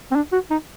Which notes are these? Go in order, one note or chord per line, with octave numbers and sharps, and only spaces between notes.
C4
D4
F#4
D#4